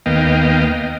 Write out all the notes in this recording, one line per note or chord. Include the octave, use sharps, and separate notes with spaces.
D#2 A#3 B3 D#5 F5 G5